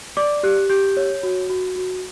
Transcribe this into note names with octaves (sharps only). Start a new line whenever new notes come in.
D5 D6
G4 F#6
G4 G6
C#5
F#4
F#4
F#4